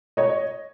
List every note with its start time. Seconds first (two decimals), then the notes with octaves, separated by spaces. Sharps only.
0.17 C#5 D#5